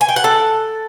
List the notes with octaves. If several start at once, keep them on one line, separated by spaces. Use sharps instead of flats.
G#5
G5
F#5
A4